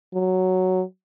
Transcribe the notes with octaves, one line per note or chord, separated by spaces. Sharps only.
F#3